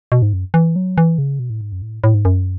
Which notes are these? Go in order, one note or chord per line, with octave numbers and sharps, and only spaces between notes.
B2
G#2
F#2
E3
F#3
E3
C#3
B2
A2
G#2
F#2
A2
A2
G#2
F#2